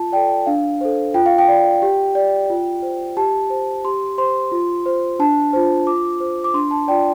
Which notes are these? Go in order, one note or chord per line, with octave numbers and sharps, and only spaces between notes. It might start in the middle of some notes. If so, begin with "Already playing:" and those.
Already playing: F4 A5
A4 D5 G5
D4 F5
A4 C5
F4 G5
F5
G5
D5
G4
D5
F4
C5
G4 A5
C5
G4 C6
C5 C6
F4
C5
D4 A5
F4 C5
F4 D6
C5
D6
D4 C6
A5
F4 D5 G5